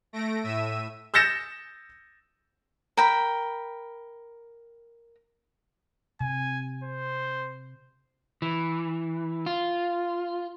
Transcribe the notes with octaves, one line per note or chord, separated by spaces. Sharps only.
A3 A#6 D7
A2 E5 E6 D#7
E6 G6 A6 A#6 C#7 E7
A#4 G5 B5
C3 G#5
C5
E3
F4